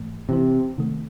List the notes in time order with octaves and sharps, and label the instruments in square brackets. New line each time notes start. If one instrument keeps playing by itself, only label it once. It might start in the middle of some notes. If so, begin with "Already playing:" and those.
Already playing: [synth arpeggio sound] G#2 E3 A3
[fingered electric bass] C3 [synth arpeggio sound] E3 C4 E4 C5
[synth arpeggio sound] C3 D#3 A3